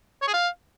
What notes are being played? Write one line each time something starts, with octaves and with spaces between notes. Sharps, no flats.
C#5
G#4
F5